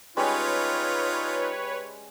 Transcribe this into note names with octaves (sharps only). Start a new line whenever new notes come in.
G3 G#3 C#4 D#4 F4 B4 C#5